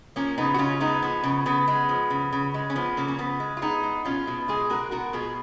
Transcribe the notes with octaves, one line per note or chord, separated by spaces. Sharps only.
F3 A#3 C#4
C#3 B3 D#4
F#4
C#3 C#4 F4
G#3 B3 D#4
F3 B3
C#3
C#3 B3
G#3
F3
C#3
C#3
G#3
C#4
F3 B3
C#3 A#3
C#4
C#3 B3
G#3
F4
G#3 B3 D#4
G#3
B2 C#4 F4
B2
G#3 F4 G#4
G#3 F#4 A#4
B2 F#4 A#4
B2 F4 G#4